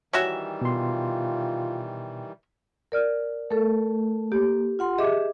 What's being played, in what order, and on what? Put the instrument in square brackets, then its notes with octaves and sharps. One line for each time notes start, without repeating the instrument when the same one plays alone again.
[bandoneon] D#3 E3 G3 [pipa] C#4 F#4 E5
[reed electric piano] B2 C6 [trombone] F4
[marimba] A#4 D5 F6
[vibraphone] A3 [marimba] A4 A#4
[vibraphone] A#3 [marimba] G4
[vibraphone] F4 F#5 C6
[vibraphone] G4 G#4 E5 [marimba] D#5 D6